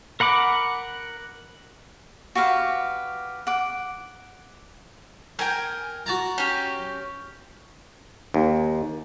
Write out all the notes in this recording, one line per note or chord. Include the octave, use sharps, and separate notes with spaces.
A#4 F#5 B5 D6
F#4 G4 B4 F5
F#5 D6
A#4 G5 G#5
F#4 A5 A#5
C#4 G4
D#2